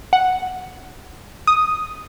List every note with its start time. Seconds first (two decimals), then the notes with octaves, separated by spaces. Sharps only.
0.13 F#5
1.47 D#6